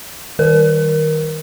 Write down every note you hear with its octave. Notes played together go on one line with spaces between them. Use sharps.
D#3 A#4